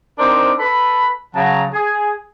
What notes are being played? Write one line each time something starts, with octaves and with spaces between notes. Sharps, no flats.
C4 D4 D#4 A#4 C5
A4 B4 B5
C#3 F#3 F#5 A5 A#5
G#4